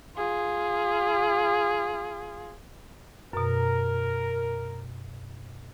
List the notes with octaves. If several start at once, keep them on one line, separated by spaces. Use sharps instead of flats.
F4 G#4
F#2 B2 A#4